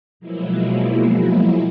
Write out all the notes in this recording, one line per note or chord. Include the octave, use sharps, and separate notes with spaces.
B2 F3 F#3 G#3 A#3 E4